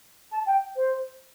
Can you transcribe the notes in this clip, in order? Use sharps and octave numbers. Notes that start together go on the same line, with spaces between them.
A5
G5
C5